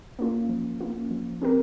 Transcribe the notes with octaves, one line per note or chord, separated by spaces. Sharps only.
A#3 C#4 F4
F3
A#3 C#4 F4
F3
C4 G4 A#4